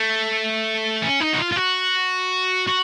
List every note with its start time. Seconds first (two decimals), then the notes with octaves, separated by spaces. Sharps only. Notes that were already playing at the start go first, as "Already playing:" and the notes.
Already playing: A3
1.02 C#4
1.20 D#4
1.33 F#4
1.38 F4
1.51 F4
1.56 F#4
2.67 F#4